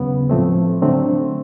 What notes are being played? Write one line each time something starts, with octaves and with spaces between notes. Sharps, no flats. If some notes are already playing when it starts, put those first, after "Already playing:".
Already playing: D#2 C#3 F#3 B3
A2 F3 A3 C4
D3 F#3 A3 C4